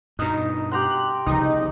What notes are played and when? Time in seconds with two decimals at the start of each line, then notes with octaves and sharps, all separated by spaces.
0.19 G2 B2 D#4
0.72 G4 A#5 C6 F#6
1.26 C2 C#3 F3 D#4